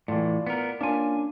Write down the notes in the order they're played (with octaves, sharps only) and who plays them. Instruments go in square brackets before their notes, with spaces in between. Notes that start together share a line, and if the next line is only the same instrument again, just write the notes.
[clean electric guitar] A2 E3 [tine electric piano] F4 D5
[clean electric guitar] B3 A#4
[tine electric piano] A#3 C#4 F4 [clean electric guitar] D4 G#5